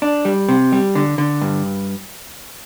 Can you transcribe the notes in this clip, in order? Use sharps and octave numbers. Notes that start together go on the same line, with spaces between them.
D4
G3
C3
G3
D3
D3
G2